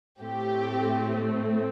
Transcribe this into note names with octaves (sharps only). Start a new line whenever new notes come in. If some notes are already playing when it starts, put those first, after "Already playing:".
A2 A3 C4 G4